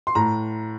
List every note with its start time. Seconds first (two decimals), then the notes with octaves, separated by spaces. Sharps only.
0.07 C6
0.15 A2 A#5